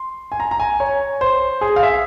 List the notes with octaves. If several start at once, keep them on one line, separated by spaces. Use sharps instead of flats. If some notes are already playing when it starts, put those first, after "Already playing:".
Already playing: C6
G#5
A#5
A#5
G#5
C#5
C5
G#4
F5
E5